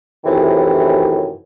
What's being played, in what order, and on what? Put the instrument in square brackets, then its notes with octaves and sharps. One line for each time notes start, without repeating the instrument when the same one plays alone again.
[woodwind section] F#2 A2 C3 D#3 E3